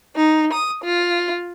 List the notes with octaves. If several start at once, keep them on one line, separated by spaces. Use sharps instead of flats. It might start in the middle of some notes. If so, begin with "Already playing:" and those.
D#4
D#6
F4